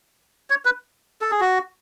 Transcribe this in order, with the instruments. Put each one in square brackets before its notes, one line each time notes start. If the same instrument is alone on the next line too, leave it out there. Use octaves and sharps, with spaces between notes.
[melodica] C#5
B4
A4
G#4
F#4